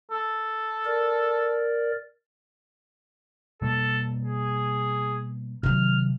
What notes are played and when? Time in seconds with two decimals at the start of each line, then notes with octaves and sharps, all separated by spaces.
0.11 A4
0.85 A#4 D5
3.62 B2 G3 A#3 A4
4.24 G#4
5.63 C3 D#3 F#3 F6